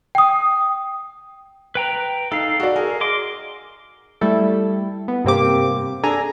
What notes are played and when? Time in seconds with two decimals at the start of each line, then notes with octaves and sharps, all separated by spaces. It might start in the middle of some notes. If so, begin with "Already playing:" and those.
0.15 G5 D#6
1.75 B4 G5 A#5
2.32 D#4 A4 F5
2.60 F#4 D5
2.76 G#4 A#4
3.01 D#5 C6 D6
4.21 G3 A3 E4 A4
5.08 B3
5.25 G2 C3 A#3 C4 G4 D6
6.03 D4 G#4 A4 G#5 A#5